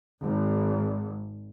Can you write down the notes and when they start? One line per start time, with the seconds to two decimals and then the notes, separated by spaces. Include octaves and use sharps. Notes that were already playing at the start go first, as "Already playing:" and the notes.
0.22 G#1